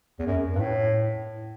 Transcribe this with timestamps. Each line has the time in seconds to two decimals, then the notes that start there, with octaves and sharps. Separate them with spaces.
0.19 E2
0.26 F#2
0.55 G2
0.60 A2